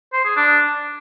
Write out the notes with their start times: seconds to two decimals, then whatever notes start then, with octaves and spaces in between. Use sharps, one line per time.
0.13 C5
0.25 G#4
0.36 D4